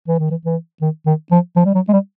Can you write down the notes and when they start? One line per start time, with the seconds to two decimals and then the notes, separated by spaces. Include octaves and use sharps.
0.08 E3
0.19 D#3
0.30 E3
0.45 E3
0.82 D#3
1.06 D#3
1.31 F3
1.56 F3
1.65 G3
1.74 F#3
1.88 G#3
1.93 G3